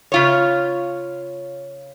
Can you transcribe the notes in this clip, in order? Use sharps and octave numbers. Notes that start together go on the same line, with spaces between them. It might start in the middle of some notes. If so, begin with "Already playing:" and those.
C#3 F4 C#5